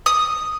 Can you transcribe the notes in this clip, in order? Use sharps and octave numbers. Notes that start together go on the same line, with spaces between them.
D#6